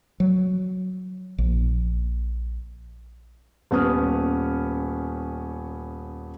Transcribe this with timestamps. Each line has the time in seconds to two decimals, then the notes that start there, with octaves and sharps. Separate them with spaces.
0.20 F#3
1.38 A#1
3.71 D#1 B3 C#4 D#6 F6